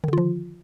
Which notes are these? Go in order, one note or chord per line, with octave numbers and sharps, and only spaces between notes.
D3 D#3 F3 F4